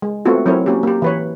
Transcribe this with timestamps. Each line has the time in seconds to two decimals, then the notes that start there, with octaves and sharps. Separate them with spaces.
0.02 G#3
0.25 A3 B3 C4 F4 F#4
0.46 F#3 C4 E4 A#4 C#5
0.66 A#3 C#4 F#4 G4
0.83 A#3 G4
1.02 E3 B4 C#5